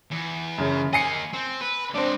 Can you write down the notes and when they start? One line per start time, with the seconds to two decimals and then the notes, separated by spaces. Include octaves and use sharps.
0.11 E2
0.58 F#2 C#3
0.93 A#3 D#5 G#5 C7 C#7
1.34 C4
1.61 B4
1.94 G#3 C4 D4 D5